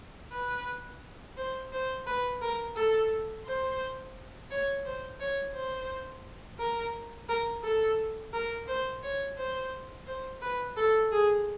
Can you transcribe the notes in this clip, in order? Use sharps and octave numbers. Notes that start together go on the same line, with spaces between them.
B4
C5
C5
B4
A#4
A4
C5
C#5
C5
C#5
C5
A#4
A#4
A4
A#4
C5
C#5
C5
C5
B4
A4
G#4